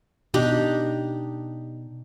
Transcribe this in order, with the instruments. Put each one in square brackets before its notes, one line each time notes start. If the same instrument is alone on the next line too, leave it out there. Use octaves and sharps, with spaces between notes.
[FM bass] B2 [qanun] D4 D#4 G4